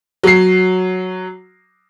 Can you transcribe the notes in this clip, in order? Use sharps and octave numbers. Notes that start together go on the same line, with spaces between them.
F#3 C7